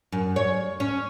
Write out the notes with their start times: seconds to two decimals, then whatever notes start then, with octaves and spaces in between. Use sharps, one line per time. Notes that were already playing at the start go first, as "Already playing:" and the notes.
0.12 F#2
0.36 C#5
0.80 C#4